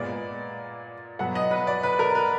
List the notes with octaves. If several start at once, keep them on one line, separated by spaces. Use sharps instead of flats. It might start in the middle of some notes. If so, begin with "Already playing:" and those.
Already playing: A#2 G#3 B3 D5
B2 F#3 B3 F#5
D#5
B4
D5
B4
A#4
B4